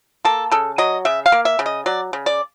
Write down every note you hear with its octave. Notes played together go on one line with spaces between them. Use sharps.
A#3 A4
C#3 A4
F#3 D#5
C#3 E5
F5
A#3
E5
C#3
D#5
F#3 D5
C#3
D5